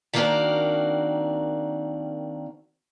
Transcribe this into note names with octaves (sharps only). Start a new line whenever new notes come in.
D#3 A#3 C4 D4 F#4 A#4